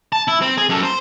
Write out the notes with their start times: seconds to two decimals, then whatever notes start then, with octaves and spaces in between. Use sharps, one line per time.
0.12 A5
0.28 E4
0.42 C4
0.58 G#4
0.69 F#2 A4
0.83 C5